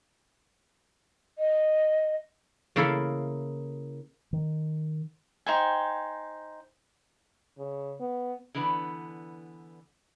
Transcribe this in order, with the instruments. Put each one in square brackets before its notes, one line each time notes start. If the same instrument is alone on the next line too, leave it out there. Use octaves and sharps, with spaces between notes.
[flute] D#5
[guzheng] C#3 A#3 E4 A4 E5 F5
[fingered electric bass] D#3
[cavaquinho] D#4 C5 G5 G#5
[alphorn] C#3
B3
[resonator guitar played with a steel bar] D3 E3 B3 D4 B4